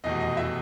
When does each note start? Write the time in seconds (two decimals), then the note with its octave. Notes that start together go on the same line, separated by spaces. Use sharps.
0.04 F1 E2 B2 D#5
0.20 D#5
0.37 E4 E5